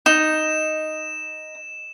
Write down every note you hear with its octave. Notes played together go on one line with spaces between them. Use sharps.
D#4 E7